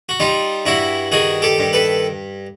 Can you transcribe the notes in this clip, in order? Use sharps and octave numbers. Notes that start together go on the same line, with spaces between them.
F#4
G3 D#4 F4
G2 E4 F#4
D#3 F#4 G#4
G4 A4
G2
A4 B4